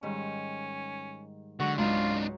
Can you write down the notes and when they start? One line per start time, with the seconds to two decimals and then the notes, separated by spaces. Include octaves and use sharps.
0.03 G#2 D#3 G3 C#4
1.60 D3 F#3 G#3 F#4 C#6
1.78 C#2 G#2 D4 D#4 F4 C#5 G#5 A#5